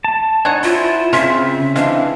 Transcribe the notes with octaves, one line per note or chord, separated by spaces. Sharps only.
A5
D4 D#4 C#5 F#5 G#5
E4 F4 C5
C#3 C4 C#4 F4 E5
E3 G#3 C4 D4 F5